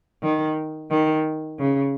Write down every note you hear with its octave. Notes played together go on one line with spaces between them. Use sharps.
D#3
D#3
C#3